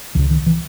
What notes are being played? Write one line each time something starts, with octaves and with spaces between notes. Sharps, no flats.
C#2 C#3 E3
D#3
E3